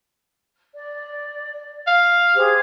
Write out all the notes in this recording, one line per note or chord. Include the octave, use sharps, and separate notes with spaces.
D5
F5
G4 G#4 C5